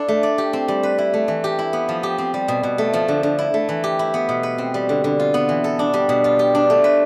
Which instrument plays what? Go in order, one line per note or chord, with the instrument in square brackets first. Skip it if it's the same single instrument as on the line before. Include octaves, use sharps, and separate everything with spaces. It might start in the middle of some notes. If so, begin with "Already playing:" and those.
Already playing: [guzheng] D4 E4 A4
A3
D5
G4
C4
G3
B4
E4
A3
E3
G4
E4
B3
F3
G4
C4
G3
B2
B2
A3
F3
D3
D3
E4
A3
E3
G4
E4
B3
B2
B4
C4
G3
D3
D3
F4
B3
E3
A4
D4
G3
B2
F4
G4
D4
A3
B4